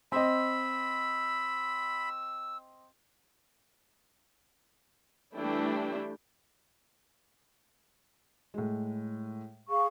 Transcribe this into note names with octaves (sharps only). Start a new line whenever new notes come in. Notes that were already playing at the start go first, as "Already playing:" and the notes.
C4 D#5 B5 E6
E3 G3 A3 D4 E4 G5
A2 G#3
G#4 F5 C#6